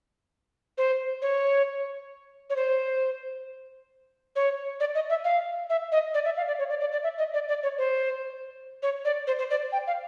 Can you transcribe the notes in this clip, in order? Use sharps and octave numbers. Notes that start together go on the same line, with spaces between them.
C5
C#5
C#5
C5
C#5
D5
D#5
E5
F5
E5
D#5
D5
E5
F5
D5
C#5
D5
D5
D5
E5
D#5
D5
D5
C#5
C5
C#5
D5
C5
C5
D5
G5
F5